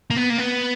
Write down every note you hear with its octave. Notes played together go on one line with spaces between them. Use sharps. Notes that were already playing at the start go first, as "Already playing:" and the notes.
A#3
B3
A#3
B3